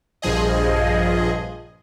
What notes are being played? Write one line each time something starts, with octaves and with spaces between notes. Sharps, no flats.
A#1 G2 F3 G#4 D#5